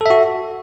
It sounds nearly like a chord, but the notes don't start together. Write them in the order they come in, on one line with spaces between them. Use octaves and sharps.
A4 E5 F#4